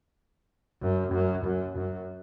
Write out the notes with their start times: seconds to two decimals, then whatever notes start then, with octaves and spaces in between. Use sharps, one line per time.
0.82 F#2
1.13 F#2
1.44 F#2
1.77 F#2